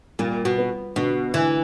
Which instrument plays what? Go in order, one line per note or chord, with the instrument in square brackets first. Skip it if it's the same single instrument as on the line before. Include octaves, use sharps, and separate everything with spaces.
[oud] A#2 [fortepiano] G3
[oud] B2
[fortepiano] B3
[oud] B2 [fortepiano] D3
[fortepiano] D2 [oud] E3